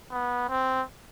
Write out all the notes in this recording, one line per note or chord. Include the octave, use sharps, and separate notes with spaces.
B3
C4